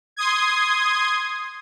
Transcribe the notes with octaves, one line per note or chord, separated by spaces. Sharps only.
C6 D#6 G#6